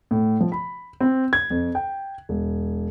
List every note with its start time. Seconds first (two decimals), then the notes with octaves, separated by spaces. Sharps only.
0.11 A2
0.40 F3
0.52 B5
1.01 C4
1.33 G#6
1.50 F2
1.75 G5
2.29 E1